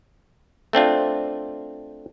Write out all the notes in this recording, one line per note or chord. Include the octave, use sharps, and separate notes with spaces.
A3 C4 D4 F4